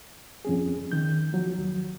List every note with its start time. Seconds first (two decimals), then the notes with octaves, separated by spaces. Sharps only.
0.45 F2 C#4 G#4
0.92 D#3 G6
1.33 F3 F#3
1.58 D#2